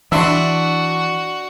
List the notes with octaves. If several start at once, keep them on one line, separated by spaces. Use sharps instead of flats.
E3 D4 F#4 E5 C6